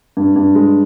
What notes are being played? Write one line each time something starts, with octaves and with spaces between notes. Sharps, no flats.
G2
G2
G#3